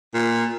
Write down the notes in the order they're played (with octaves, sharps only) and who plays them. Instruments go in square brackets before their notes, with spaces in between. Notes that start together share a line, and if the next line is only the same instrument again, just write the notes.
[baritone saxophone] A#2